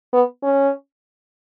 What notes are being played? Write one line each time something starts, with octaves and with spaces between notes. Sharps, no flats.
B3
C#4